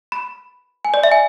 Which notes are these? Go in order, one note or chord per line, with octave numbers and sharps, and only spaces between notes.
B5
G#5
D5
E5
G#5